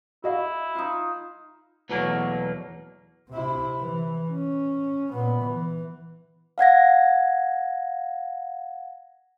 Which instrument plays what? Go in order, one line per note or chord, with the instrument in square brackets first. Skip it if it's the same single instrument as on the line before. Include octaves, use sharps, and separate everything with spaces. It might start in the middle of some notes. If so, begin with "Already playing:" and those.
[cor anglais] E4 [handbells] F#4 D#5 F5
[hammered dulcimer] D#4 F4
[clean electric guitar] E2 B2 E3 F#3 A3 A#3
[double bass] C3 E4
E3
C#4
A#2 B3
E3
[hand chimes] F5 F#5 G#6 A#6